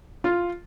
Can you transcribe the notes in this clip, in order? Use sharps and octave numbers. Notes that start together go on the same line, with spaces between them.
F4